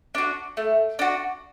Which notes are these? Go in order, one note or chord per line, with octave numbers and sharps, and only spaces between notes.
D4 F#4
A3
D4 F#4